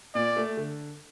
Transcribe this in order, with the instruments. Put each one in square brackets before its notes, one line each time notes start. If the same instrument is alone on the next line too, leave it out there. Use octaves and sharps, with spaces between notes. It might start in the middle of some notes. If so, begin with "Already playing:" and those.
[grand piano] A#2 [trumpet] D5
[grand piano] A3
D3